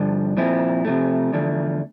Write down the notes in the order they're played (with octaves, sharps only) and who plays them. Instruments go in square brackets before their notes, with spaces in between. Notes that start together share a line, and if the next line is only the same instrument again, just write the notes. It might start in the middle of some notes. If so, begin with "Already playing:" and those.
Already playing: [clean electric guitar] G2 D3 F3
A#2 F3 C4 E4
C3 F3 A3
E2 D3 F3 A3